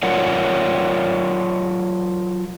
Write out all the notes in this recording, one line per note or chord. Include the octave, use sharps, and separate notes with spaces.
F#3 F4 A#4 C#5 D5 F#5